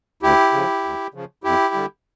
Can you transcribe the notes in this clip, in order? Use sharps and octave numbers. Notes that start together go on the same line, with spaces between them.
D2 E4 G4
C#3 F3
D2
C#3 F3
F2 E4 G4
D3 G3